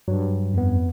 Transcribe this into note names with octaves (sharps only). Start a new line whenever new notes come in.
G2 F#3
F2 B3